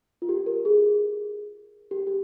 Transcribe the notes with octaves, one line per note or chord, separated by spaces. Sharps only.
F4
G4
A#4
G#4
G4
G4